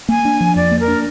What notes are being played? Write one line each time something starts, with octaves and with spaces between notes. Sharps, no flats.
A#3 G#5
D4
F3
F2 D5
A#3
A#4
D4